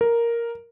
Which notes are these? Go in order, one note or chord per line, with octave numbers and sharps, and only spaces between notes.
A#4